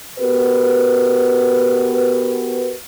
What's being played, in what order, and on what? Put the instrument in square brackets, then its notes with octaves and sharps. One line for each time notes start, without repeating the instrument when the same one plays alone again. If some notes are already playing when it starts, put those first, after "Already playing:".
[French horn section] B3 F#4 G4 A#4 B4